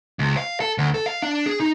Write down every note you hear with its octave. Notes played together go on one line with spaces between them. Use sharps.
C#2
F5
A4
D2
A4
F5
D4
G#4
D#4